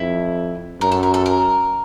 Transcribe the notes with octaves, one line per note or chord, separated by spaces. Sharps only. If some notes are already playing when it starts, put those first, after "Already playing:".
Already playing: F2 E4
F#2 A#4
A4
A#4
A4
A#4